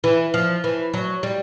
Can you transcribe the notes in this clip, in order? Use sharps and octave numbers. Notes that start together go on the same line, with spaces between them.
E3
F3
E3
F#3
G3